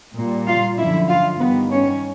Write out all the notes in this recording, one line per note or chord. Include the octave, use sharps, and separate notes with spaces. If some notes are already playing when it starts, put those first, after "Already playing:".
A#2 G3
F4 F5
F#2 D3 F3 E4 E5
F4 F5
G2 D#3 G3 B3 B4
C#4 C#5